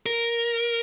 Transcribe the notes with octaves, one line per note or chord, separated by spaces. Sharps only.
A#4